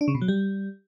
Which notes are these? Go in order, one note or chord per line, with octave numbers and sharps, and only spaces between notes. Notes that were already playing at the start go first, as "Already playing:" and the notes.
D4
C#3
B2
F#3
G3